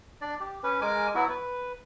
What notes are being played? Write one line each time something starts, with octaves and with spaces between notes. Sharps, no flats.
D4 D5
G4
C#4 B4
G#3 A#4 G#5 D6
F#3 B3 E4 F#4
B4